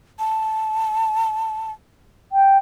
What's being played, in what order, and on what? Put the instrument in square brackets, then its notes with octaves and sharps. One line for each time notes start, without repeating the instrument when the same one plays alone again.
[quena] A5
[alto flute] G5